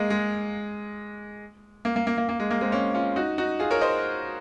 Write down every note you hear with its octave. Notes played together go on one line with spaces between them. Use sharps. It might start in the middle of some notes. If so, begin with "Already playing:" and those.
Already playing: G#3 A#3
G#3
A#3
A#3
A#3
A#3
A#3
G#3
A#3
G#3 C4
A#3 C#4
C#4 F4
D#4 F#4
D#4 F#4
F4 G#4
A#4 C#5
C5 D#5